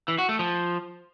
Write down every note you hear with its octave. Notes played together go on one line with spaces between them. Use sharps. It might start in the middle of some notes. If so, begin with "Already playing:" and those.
E3
F#4
A3
F3